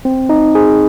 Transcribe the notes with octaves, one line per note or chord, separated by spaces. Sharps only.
C4
D#4
G#4